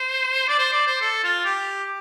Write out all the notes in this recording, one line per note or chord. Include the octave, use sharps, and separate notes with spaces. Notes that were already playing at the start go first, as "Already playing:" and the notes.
Already playing: C5
D5
C5
D5
C5
A4
F4
G4